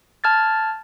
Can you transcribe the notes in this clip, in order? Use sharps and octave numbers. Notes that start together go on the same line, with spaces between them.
A5 F6 G#6 A6